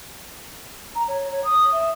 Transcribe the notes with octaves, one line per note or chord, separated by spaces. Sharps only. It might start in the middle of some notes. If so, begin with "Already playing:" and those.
A#5
C#5
C#5
D#6
E5